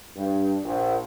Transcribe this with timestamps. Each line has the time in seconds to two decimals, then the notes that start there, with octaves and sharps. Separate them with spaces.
0.16 G2
0.64 A#1